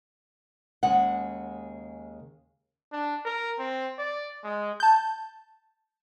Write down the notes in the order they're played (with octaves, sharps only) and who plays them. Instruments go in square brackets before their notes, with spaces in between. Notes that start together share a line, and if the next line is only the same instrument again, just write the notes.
[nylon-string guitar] D#2 C#3 G#3 F#5
[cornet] D4
A#4
C4
D5
G#3
[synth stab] A5 G6